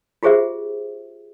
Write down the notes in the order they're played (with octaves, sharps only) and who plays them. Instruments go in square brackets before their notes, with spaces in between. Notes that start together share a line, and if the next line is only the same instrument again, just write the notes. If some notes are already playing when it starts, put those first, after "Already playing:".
[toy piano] F4 G4 G#4 C5 E5